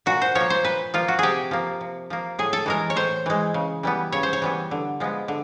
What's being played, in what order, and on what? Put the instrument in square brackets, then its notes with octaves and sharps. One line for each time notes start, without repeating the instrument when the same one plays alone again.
[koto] A#2 F#4
C5
F3 C#5
A#3
C5
A#2 B4
F3 A#3 F4
F#4
C3 G4 G#4
F3 A#3
C3
F3 A#3
A2 G#4
A4
E3 G#3 A#4
C#5
A2 C5
E3 G#3
C#3
E3 G3 B3
C#3 C#5
C5
C#5
E3 G3 B3
D3
F3 G#3 B3
D3